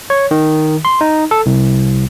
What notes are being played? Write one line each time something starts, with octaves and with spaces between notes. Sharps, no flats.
C#5
D#3
C6
D#4
A4
C2